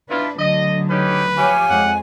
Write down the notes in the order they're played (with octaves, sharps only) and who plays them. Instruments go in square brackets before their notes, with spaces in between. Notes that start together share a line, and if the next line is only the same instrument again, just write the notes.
[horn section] B2 E4 F4 [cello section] D4 B4
[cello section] D2 D3 F#3 [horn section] D#5
[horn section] C#4 D#4 G4 [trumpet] B4
[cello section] F3 C#5 [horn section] G4 F5 [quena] G#5
[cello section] F2 G#3 [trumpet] F#5